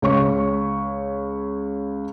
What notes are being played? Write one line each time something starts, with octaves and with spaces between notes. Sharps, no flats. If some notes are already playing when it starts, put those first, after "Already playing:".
C#2 C#5 C#6